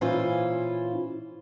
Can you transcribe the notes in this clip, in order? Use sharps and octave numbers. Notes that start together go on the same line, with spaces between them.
A#2 E3 C#4 E4 F4 C5